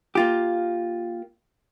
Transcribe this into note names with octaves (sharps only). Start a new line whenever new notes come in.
A#3 F4 G4